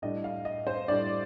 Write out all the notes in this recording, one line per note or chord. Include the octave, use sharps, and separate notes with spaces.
A2 G3 D4 D#5
F5
D#5
C5
A2 G3 D4 D5